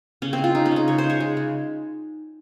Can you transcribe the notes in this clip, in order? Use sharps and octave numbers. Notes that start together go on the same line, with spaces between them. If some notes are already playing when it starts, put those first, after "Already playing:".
C#3 C#4
C4
G#3
F4
G#3 D#4
C#4
C#3 D#4
C#3 C#5
C5
G#3
C#5
G#3
C#3